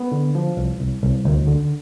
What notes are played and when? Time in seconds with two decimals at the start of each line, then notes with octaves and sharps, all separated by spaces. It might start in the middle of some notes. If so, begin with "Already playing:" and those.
Already playing: B3
0.12 D3
0.35 F3
0.57 C2
0.79 C2
1.02 C2
1.25 D2
1.47 D3